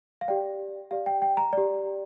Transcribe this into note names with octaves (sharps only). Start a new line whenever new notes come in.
F5
G4 D5 G5
G4 D5 F5
G5
G5
A#5
G4 D5